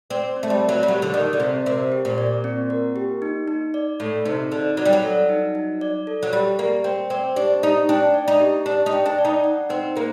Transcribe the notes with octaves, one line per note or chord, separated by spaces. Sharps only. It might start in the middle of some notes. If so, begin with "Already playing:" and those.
C4 D5
C4
A3
G3
A#4
F#3
G3
F#3 G4
D3
D#3 D5
D3
C3 C4
C3 A#4
G4
A#2
D5
C4
A#4
G4
D#4
D#4
D5
A2 A4
C3 D#4
D3 D#4
F#3 D5
G3
F#3
A4
D#4
D#4
D5
A4
F#3
G3 G4
A#3 G4
C4 G5
C4 D5
D4 G4
D#4 G4
D4 G5
D5
D#4
G4
D4 G4
D#4
G5
D4
D5
D#4
F#5
C4 D#4
A#3 C5